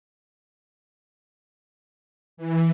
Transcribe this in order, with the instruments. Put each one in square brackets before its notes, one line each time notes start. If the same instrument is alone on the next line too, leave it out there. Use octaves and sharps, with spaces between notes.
[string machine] E3